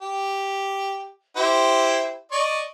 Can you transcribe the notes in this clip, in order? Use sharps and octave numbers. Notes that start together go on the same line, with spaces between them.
G4
E4 G4 C5
D5 D#5 C#6